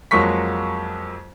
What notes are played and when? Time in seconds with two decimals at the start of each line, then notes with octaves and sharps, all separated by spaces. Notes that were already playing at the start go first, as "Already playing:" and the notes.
0.11 F2 F#3 G#3 A#3 C#6 B6